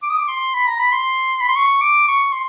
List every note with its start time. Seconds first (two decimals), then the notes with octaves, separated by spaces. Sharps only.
0.03 D6
0.10 D#6
0.18 D6
0.28 C6
0.54 B5
0.67 A#5
0.79 B5
0.92 C6
1.41 B5
1.48 C6
1.56 C#6
1.81 D6
2.08 C#6
2.33 C6